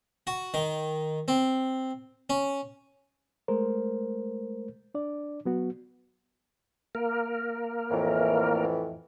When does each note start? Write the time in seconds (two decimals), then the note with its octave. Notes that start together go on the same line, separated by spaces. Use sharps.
0.27 F#4
0.54 D#3
1.28 C4
2.30 C#4
3.48 G#3 A3 A#4 C5
4.95 D4 D5
5.45 F#3 B3 F#4
6.95 A#3 A#4
7.91 F2 A2 E3